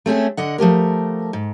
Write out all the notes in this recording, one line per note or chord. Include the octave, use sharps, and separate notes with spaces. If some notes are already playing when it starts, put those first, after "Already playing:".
A3 C4 C#4 G#4
D3 D#5 F#5
F3 A3 G4 A#4
G#2